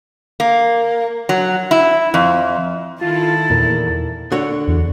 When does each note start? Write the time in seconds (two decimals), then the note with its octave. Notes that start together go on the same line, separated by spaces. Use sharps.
0.40 A#3
1.29 F#3
1.71 E4
2.14 F2
3.01 D#3 E4 F4 A4 A5
3.50 E2 A#2 A#4
4.32 D3 F#4 C#5
4.68 E2